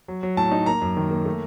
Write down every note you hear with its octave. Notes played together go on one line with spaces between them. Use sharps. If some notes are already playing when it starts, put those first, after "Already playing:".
F#3
F#3
A2 A5
D#4
A#3 A#5
F#2
D#3
A#3
A3